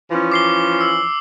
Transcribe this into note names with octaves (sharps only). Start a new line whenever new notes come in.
E3 F3 C#4
D6 C7 G7
E6